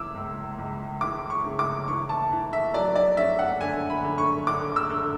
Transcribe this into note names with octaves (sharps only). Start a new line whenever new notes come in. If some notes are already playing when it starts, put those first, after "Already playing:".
Already playing: C#3 E3 D6 E6
C#2
C#2
E3 D6
C#6
C#3
D6
E3 C#6
A5
E3
E5
F#3 D5
D5
C#4 E5
F#5
D3 G#5
B5
D3
C#6
D3 D6
E6
D3